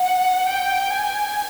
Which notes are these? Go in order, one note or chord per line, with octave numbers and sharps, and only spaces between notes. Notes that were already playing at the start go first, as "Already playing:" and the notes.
Already playing: F#5
G5
G#5